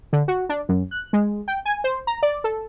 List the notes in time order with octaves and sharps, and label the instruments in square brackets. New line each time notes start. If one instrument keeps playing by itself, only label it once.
[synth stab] D3
F#4
D4
F#2
F#6
G#3
G5
G#5
C5
A#5
D5
A4